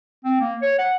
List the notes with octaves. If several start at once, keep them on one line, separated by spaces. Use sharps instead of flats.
C4
A#3
C#5
F#5